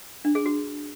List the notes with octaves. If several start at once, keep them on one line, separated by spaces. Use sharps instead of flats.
D4
G#4
F#4